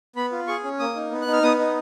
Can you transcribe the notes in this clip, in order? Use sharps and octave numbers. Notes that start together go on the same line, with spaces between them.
B3 B5
F4
G#4 C#6
C#4
A#3 D#6
D#4
B3
F#6
D#4
F6
B3 D#6
D#4